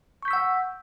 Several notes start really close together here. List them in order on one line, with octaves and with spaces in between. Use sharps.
C#6 G6 B6 E6 F#5